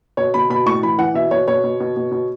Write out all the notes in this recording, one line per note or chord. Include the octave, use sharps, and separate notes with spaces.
B2 C#5
B2 B5
B2 B5
A2 C#6
E3 B5
E3 F#5
B2 E5
B2 C#5
B2 C#5
B2
B2
B2
B2